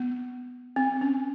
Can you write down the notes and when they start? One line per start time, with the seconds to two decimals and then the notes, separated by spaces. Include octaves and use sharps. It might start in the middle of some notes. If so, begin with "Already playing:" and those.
Already playing: B3
0.76 C4
1.01 C#4